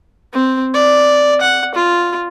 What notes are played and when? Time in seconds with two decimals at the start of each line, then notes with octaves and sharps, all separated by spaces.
0.34 C4
0.74 D5
1.41 F#5
1.75 F4